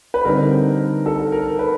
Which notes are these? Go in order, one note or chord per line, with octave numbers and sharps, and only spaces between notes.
B4
D3 G3 C4 D#4 A#4
A4
A#4
B4